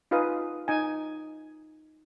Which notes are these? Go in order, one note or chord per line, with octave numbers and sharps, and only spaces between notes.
D#4 F4 G#4 B4 F5 D#6
D#4 G#5